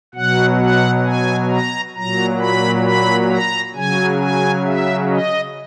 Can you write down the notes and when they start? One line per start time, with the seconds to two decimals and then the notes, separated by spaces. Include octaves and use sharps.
0.15 B2 F#3 F#5
0.60 F#5
1.05 G#5
1.50 A#5
1.95 A#2 F#3 A#5
2.40 B5
2.85 B5
3.30 A#5
3.75 C#3 F#3 G#5
4.20 G#5
4.65 E5
5.10 D#5